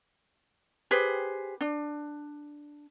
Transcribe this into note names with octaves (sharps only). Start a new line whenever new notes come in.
G4 G#4 B4 C5
D4